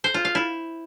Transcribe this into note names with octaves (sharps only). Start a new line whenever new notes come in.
C5
F4
F5
E4